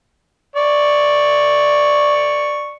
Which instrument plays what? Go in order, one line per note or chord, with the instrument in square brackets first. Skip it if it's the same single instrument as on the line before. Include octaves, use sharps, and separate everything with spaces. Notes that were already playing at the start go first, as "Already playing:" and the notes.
[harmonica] D5 C#6